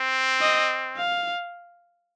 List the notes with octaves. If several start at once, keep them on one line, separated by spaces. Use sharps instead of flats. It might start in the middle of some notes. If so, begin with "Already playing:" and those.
Already playing: C4
D#5
F5